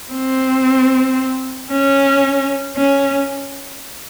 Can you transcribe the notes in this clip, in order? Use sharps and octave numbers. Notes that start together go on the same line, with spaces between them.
C4
C#4
C#4